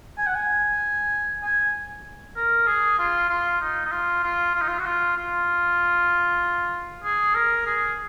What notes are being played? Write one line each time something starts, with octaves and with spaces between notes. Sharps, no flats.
G#5
F#5
G#5
G#5
A#4
G#4
F4
F4
D#4
D#4
F4
F4
F4
D#4
F4
F#4
F4
F4
G#4
A#4
G#4